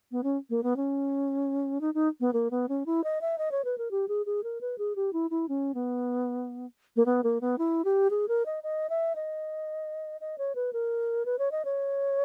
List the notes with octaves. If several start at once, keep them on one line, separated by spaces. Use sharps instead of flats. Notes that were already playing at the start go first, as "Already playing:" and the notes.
B3
C#4
A#3
B3
C#4
D#4
D#4
B3
A#3
B3
C#4
E4
D#5
E5
D#5
C#5
B4
A#4
G4
G#4
G#4
A#4
B4
G#4
G4
E4
E4
C#4
B3
A#3
B3
A#3
B3
E4
G4
G#4
A#4
D#5
D#5
E5
D#5
D#5
C#5
B4
A#4
B4
C#5
D#5
C#5